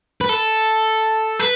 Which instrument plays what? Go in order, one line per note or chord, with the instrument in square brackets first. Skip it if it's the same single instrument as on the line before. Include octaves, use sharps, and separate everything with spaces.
[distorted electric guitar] B4
A4
B4